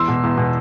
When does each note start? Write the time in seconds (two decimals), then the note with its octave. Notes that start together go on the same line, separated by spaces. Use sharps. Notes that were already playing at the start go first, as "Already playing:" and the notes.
Already playing: E2 E3 C6 E6
0.08 B2
0.23 E2
0.38 B2